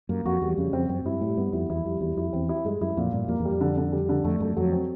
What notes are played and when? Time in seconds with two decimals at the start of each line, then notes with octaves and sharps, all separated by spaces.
0.09 F#2 A#3
0.25 F2 F#4
0.42 E2 G3
0.58 F2 C#3
0.73 F2 C4
0.89 F#2 C4
1.05 G2 E4
1.21 A2 G3
1.37 G2 B3
1.53 F2 E4
1.70 E2 E4
1.85 F2 G3
2.01 E2 E4
2.17 F2 E4
2.33 E2 C4
2.49 E4
2.65 G2 G#3
2.81 F#2 E4
2.97 F2 A#2
3.12 G2 A#2
3.28 F2 A#3
3.39 E2
3.45 F2 G3
3.61 D3
3.77 D3
3.92 G3
4.09 D3
4.24 F2 A3
4.40 F#2 A3
4.57 F2 F#3
4.72 C4